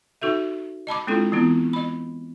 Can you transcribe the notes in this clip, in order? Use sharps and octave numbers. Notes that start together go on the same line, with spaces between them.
D#4 F#4 A4 E5
D#5 A5 B5 D6
G#3 C4 D4 E4 F4 A4
E3 B3 C4 E4
D#5 B5